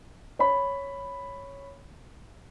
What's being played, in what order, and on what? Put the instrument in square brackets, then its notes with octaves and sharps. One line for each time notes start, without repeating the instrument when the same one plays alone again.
[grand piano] C#5 B5